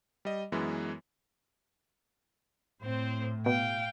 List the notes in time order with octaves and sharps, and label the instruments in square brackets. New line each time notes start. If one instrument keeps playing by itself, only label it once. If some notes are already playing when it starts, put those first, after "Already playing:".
[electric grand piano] G3 D#5
F#2 E3 G#3 B3
[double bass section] A2 [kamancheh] C4 C5
[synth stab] B2 [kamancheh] F5 G5